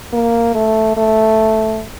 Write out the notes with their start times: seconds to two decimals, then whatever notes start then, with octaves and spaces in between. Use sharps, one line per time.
0.13 A#3
0.55 A3
0.97 A3